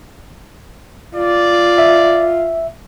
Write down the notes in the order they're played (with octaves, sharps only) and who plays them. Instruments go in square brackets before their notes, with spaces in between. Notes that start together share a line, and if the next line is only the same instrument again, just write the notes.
[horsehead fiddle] F4 [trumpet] D5
[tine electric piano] E5